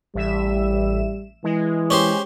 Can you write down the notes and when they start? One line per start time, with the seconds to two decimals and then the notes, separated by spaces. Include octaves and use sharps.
0.15 A1 G3 E5 E7
1.44 E3 G#3
1.90 C#4 G4 C5